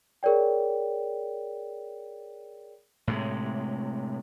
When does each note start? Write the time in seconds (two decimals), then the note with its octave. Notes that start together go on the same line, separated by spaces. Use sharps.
0.23 G#4 A#4 C#5 D5 G5
3.07 A2 C3 G#3